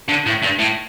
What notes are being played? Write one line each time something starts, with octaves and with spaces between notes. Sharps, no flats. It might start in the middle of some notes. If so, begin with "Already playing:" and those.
D3
A2
G2
A2